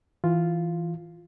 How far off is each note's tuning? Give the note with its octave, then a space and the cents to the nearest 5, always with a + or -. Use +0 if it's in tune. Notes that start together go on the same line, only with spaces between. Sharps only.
E3 +0 F4 +0